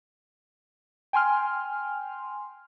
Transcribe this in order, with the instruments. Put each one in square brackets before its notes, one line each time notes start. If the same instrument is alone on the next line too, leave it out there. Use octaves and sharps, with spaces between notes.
[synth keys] G5 G#5 C6 F6